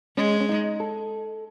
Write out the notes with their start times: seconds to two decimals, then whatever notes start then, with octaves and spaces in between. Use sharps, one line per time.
0.17 G#3 C#4
0.40 C#4
0.49 D#4
0.80 A4